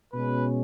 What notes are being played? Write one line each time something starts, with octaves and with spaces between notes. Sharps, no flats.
B2 G#3 C#4 B4